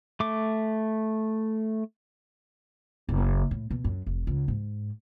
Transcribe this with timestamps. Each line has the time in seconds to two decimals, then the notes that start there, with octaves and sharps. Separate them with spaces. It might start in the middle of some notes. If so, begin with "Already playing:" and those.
0.20 A3 D6
3.09 F#1
3.51 A2
3.71 B2
3.84 F#2
4.06 F1
4.27 C#2
4.48 G#2